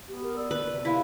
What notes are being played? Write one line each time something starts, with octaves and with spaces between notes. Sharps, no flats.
B3 G4
A#4
D5 E6
B4 B5
C3
E4 F4 F5 B5 B6